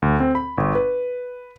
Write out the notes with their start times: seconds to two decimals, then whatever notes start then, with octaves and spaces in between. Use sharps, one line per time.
0.02 D2
0.20 C4
0.35 B5
0.58 G1
0.75 B4